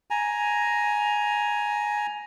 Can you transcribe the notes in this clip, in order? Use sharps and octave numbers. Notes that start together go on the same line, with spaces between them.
G#5 A#5